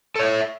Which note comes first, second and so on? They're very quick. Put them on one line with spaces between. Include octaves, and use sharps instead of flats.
A4 C#5 E5